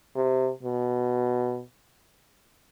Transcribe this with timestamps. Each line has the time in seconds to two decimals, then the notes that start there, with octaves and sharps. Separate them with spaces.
0.16 C3
0.63 B2